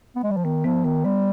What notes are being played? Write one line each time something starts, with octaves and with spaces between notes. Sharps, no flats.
B3
G#3
G3
F3
D#3 B3
F3 B3
D#3 B3
G3 B3